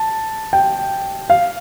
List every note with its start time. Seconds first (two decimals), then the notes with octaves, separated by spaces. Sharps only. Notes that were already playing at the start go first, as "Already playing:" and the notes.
Already playing: A5
0.53 G5
1.30 F5